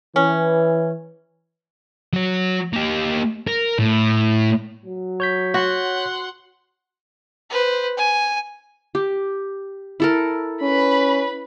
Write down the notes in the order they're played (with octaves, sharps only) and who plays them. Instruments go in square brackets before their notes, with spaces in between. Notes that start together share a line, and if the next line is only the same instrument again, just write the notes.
[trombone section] E3 [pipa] C#4
[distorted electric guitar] F#3 F#4
A#3 G4
A#4
A2
[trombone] F#3
[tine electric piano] C#5 G6 B6
[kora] F#4 [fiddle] F#5 C6
[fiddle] B4 C5
G#5
[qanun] G4
E4 A4 A#4
[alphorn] C#4 [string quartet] B4 B5